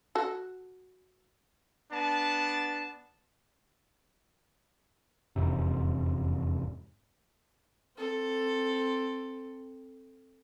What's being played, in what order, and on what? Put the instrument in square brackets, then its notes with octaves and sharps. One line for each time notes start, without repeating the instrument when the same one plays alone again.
[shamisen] F#4 A4
[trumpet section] B3 D4 A5
[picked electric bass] E1 F2 G#2 C3
[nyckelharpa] C4 A4